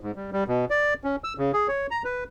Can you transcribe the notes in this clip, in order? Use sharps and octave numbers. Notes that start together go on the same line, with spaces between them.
G#2
G3
G3
B2
D5
C#4
E6
C#3
G#4
C#5
A#5
B4